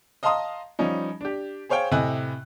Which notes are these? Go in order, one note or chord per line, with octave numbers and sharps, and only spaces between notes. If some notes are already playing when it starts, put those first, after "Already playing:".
D#5 F5 A5 A#5 C6 D#6
F3 G3 C#4 D#4
D4 G4
G#4 C5 C#5 F5 G5
A2 C3 D#5 G#5 F#6